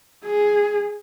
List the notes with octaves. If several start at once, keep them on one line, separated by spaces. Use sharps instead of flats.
G#4